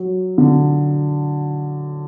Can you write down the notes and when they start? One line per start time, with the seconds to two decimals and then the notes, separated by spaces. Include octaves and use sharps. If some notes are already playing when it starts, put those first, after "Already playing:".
Already playing: F#3
0.38 D3